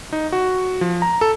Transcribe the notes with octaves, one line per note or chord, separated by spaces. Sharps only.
D#4
F#4
F3
A#5
A4